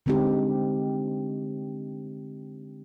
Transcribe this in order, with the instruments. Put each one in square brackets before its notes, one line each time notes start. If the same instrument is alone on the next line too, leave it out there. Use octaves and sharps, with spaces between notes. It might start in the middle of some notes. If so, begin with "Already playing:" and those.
[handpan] D3 G#3 C4 D#4 G4